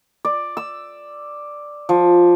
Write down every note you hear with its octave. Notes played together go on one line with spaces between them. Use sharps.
D5
E6
F3